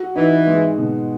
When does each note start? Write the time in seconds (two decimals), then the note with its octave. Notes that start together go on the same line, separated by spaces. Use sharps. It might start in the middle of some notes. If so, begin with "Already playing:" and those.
Already playing: F#4
0.15 E3 D#4
0.47 G#3
0.78 B2